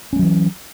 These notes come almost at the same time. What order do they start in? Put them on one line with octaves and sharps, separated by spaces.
C#4 A3 F#3 E3